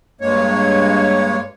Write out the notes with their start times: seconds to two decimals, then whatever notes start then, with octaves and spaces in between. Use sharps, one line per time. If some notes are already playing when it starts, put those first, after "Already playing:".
0.21 G2 G#3 A#3 C#5